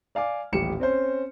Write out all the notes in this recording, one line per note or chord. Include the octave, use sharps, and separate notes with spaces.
D5 F5 G#5 D6
D#1 A1 G4 C#7 E7
C4 C#4 C5